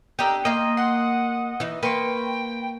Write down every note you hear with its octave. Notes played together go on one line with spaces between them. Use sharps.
D4 G4 A4 A#4 D#5
A#3 D#5 F5 G5 A#5 C6
F#5 C6
E3 D#4
A#3 B4 G5 C6 C#6